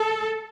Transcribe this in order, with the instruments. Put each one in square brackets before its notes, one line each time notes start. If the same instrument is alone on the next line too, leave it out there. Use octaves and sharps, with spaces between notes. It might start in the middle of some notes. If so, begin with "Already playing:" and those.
Already playing: [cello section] A4